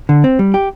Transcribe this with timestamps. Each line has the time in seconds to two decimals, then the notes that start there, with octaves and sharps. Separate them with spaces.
0.09 D3
0.24 C4
0.39 G3
0.54 G4